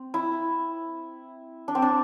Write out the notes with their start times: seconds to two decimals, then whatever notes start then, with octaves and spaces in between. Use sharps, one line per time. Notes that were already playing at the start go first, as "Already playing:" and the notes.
Already playing: C4
0.14 E4
1.68 D4
1.75 C4
1.82 D4